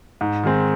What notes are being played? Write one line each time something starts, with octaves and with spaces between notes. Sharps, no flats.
G#2
D#3 G#3 C4